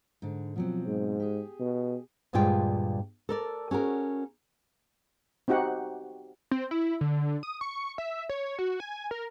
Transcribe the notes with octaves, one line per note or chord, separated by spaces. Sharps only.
G#2 D3
B2 F3 F#3 C4
G#2
G4 G#4
B2
D2 G2 A#2 G#3 F4 G5
A4 A#4 D5
C#4 F#4 G#4 A#4
C4 D#4 F#4 G4 F#5
C4
E4
D3
D#6
C#6
E5
C#5
F#4
G#5
A#4